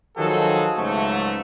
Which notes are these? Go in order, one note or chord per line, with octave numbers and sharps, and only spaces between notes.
D#3 F3 F#3 F#4 G#4 A4
C#2 G#2 F3 F#3 A3